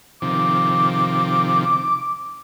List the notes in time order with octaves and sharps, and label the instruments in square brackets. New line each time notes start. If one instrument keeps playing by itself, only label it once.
[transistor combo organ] C3 D#3 F3 [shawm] D6